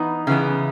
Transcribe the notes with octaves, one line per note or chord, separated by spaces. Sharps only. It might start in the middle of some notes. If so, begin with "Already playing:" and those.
Already playing: E3 B3 D#4
C#3 E3 B3